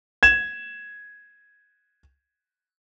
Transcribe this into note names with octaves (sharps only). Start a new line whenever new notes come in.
G#6 E7